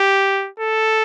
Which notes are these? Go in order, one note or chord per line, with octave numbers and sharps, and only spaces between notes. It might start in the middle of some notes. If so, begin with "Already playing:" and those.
Already playing: G4
A4